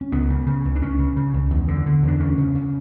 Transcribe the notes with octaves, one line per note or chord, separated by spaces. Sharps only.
C#4
C#2 B3
C#3
C#3
C#2
D4
C#2 C#4
C#3
C#3
C#2
E2
D3
D3
E2 D4
D2 C#4
C#3
C#3